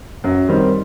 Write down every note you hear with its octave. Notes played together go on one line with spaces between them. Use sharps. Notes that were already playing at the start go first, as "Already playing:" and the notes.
F#2
D#3 G3 C4